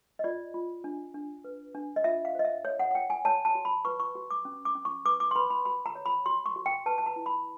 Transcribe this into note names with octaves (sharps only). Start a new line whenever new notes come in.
D#5
F4 D5
F4
D4
D4
B4
D4
D#5
F4 E5
F5
C5 D#5
E5
C#5
F#5
F#5
C#5 G5
G#5
C#5 A5
A5
F#4
B5
B4 C#6
C#6
F#4
D6
C#4
D6
C#4
C#6
B4 D6
D6
C6
B4 B5
B5
F#4 B5
A#5
C#5
B5
F#4 C6
C#6
F#4
G5
B4 A5
A5
A#5
E4
B5